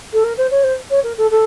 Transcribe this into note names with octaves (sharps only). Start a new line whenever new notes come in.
A4
A#4
C5
C#5
C5
C#5
A#4
A4
A4